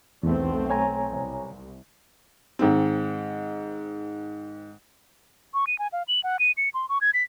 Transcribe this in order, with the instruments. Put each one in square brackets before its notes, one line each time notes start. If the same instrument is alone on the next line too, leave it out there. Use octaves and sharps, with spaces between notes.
[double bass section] B1 A3 C4 [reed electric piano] E2
[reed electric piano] C#5 G#5 A#5
[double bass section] C2
[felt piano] G#2 D#3 C4
[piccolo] C#6
D#7
G#5
F5
F#7
F#5
D#7
C#7
C6
C#6
G#6
B6